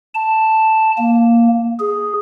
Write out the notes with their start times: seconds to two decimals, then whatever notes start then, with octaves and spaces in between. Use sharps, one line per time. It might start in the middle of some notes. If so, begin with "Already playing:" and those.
0.14 A5
0.98 A#3
1.80 G#4